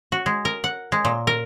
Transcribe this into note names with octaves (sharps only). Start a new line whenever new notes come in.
F#4
G#3
A#4
F#5
G#3
A#2
A#4